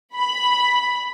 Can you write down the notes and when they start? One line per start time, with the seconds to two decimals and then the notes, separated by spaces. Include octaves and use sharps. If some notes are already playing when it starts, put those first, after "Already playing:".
0.15 B5